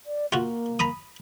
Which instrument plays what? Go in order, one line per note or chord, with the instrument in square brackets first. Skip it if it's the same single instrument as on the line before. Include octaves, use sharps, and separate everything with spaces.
[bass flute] D5
[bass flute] A#3 [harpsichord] F4 F#4
[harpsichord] A#5 B5 D#6